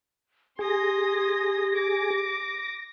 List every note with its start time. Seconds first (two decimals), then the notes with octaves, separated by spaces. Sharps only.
0.59 G4 G#4 C6 D#6 A#6
1.75 D6